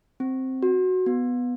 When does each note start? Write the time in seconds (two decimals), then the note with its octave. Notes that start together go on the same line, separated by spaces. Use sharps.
0.20 C4
0.63 F#4
1.06 B3